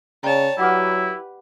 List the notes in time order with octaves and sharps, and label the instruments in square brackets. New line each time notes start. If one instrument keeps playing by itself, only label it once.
[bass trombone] C#3 [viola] C#5 A5 [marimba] D5 G5 A#5
[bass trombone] F#3 [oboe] E4 [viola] G4 B4 [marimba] F#5 D6 F6